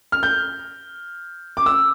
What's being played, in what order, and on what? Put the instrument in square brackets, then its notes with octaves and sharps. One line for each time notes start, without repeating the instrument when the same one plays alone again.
[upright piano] F6
G6
D6
E6